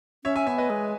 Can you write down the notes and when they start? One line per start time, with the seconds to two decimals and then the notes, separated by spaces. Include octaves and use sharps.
0.24 C#4 C#5 E5
0.36 E5 G#5
0.47 B3 E5 G#5
0.58 B4 D#5
0.70 G#3